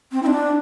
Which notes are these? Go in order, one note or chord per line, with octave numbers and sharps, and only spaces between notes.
C4
E4
D4